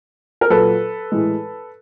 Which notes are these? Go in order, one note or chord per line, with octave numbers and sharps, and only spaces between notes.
A#4
A#2 F#3 A4 B4
A2 E3 G#3